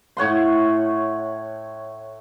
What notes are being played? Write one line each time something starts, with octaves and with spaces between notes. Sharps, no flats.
A2 C#5 F#5 C6